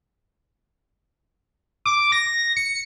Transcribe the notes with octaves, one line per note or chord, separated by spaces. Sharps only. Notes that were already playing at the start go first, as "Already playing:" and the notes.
D6
A#6
C#7